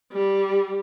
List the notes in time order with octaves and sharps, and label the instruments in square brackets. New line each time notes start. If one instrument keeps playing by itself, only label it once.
[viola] G3